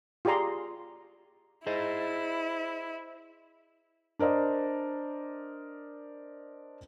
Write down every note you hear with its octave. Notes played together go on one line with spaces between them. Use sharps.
F4 G4 G#4 D5 A#5 C6
E4 G#4 C5 D#5
D4 A#4 C5 D5 D#5